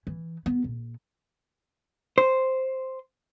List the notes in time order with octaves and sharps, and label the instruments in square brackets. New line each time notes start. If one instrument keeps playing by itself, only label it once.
[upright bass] E3
B3
A#1
[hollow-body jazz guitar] C5